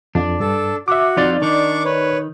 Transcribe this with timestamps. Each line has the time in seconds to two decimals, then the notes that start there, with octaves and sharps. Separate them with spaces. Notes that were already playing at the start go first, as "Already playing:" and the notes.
0.15 F2 D4
0.40 G2 A4
0.88 F#4 E5 D6
1.17 F2 D#4 F4 D5 A6
1.42 D#3 D4 C#6 D6
1.85 B4 C#5